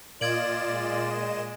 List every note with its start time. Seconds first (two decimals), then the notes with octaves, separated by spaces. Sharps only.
0.21 A#2 F4 D5 D#5 G#6 D7 E7 F#7
0.71 G#3